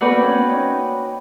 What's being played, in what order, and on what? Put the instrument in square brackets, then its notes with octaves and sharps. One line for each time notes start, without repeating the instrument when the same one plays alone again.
[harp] A3 B3 [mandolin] F#4 B4 D5 G5
[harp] A#3 C4
B3 C#4
C#4 D#4